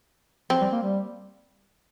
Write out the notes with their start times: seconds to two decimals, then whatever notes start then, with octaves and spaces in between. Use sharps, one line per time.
0.50 F3 C4
0.61 G3
0.72 A#3
0.82 G3